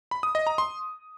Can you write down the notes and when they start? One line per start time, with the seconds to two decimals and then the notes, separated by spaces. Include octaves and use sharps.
0.11 B5
0.23 D#6
0.35 D#5
0.47 A#5
0.58 C6